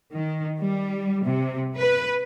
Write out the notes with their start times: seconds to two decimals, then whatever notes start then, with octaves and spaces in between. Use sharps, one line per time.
0.15 D#3
0.60 G3
1.25 C3
1.77 B4